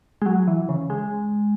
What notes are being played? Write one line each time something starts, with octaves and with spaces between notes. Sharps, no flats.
G#3
F#3
E3
C#3
G#3